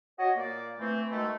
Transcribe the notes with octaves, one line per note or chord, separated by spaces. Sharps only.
F#4 C#5 D#5
A#2 A#3 D5
E3 A3 C4
B2 D#3 G#3 A3